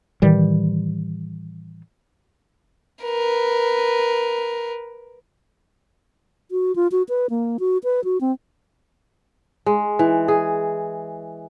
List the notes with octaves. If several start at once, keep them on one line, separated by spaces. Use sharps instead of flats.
A2 D#3 E3 G3
A#4 B4
F#4
F4
F#4
B4
A#3
F#4
B4
F#4
C4
G#3
E3
G#4